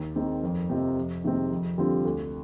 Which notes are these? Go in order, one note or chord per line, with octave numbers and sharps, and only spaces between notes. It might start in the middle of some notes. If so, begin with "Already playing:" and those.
Already playing: D#2
D#3 G#3 C4 D#4
F2
C3 F3 C4 D#4
F2
C3 D#3 G#3 C4
F2
D3 G3 C4 F4
D2